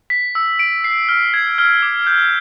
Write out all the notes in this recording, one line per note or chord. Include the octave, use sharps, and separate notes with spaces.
B6
E6
D7
C7
F6
G#6
F6
D6
G6